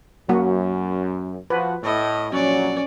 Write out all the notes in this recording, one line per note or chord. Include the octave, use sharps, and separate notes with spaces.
F#2 F#3 A#3 F#4
F3 F#4 B4
A2 D#5
A#1 F#3 C#4 D5